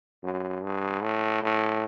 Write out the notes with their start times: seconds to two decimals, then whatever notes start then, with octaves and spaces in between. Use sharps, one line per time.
0.24 F#2
0.63 G2
1.03 A2
1.43 A2